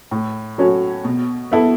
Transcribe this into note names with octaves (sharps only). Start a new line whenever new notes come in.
A2
F#3 C#4 F#4 A4
B2
B3 E4 A4